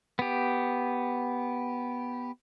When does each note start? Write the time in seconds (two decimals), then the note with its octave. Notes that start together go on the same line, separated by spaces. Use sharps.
0.19 B3 G4